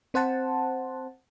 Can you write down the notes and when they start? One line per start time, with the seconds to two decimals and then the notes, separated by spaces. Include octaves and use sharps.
0.14 C4 C5 F#5 A5